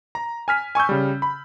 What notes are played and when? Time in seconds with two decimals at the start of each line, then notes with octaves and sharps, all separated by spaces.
0.15 A#5
0.48 G#5 F6 B6
0.75 G#5 C#6 E6 G6
0.89 C#3 G3
1.22 B5